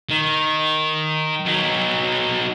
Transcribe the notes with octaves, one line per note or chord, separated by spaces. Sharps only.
D#3
F#3 D#4